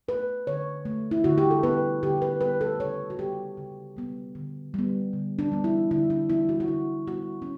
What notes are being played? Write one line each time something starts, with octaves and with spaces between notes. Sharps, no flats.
A3 B4
D3 C#5
A3
E4
D3 F#4
G4
A4
G3 B3 B4
D3 G4
B4
G3 B3 B4
A4
C#3 C#5
F#4
G3 B3 G4
C#3
G3 B3
D3
G3 B3
D3
D4
G3 B3
E4
D3 E4
D4
G3 B3 E4
F#4
F#4
D3 E4
G3 B3 F#4
C#4